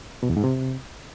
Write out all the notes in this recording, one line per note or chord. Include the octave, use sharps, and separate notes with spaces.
B2
E2
G#2
C3